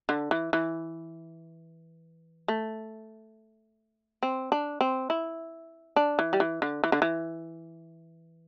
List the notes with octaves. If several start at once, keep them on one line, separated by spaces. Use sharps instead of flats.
D3
E3
E3
A3
C4
D4
C4
E4
D4
E3
G3
E3
D3
E3
D3
E3